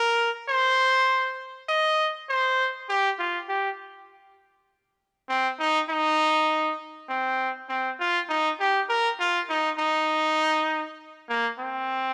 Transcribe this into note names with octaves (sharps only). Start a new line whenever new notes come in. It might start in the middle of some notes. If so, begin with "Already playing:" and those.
Already playing: A#4
C5
D#5
C5
G4
F4
G4
C4
D#4
D#4
C4
C4
F4
D#4
G4
A#4
F4
D#4
D#4
A#3
C4